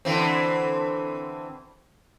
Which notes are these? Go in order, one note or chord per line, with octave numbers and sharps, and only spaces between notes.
D3 E3 C4